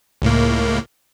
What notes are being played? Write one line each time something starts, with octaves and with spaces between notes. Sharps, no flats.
C#2 A2 A#3